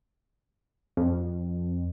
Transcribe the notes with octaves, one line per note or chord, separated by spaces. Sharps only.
F2